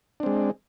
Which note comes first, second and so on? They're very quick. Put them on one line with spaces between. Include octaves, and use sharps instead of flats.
D4 C4 G#3